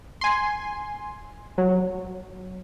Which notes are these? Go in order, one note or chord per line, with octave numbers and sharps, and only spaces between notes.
G#5 C6
F#3